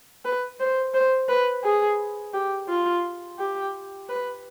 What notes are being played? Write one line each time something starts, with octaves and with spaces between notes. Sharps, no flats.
B4
C5
C5
B4
G#4
G4
F4
G4
B4